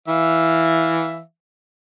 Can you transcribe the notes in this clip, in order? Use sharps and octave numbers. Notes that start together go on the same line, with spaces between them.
E3 E5 F5